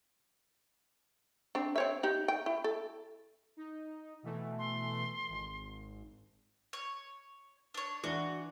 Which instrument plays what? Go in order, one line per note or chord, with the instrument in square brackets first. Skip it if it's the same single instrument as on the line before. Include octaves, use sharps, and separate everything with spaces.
[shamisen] C4 D4
C4 C#5 E5
D#4 G4
G5
E4
A4
[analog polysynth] D#4
B2 E3 A3
[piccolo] C6
[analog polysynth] G#1
[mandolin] C#5
D4 C#5
[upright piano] E3 D4 G7 [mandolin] F#4